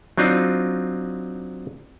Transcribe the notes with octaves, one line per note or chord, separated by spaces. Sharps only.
F#3 C4 D4 D#4 F4